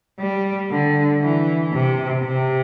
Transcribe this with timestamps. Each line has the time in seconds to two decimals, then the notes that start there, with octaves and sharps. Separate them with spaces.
0.20 G3
0.70 D3
1.21 E3
1.73 C3
2.24 C3